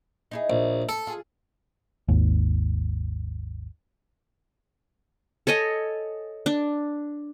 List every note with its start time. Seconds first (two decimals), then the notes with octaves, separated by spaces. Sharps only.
0.31 D#4 E4 G#4
0.50 A#1
0.89 A4
1.07 F4 G#4
2.08 G#1 D#2
5.47 A4 C#5 D#5 G#5
6.46 D4